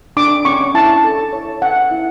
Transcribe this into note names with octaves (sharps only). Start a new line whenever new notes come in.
D4 D6
C#4 C#6
E4 A5
A4
C#5
C#4 F#5
E4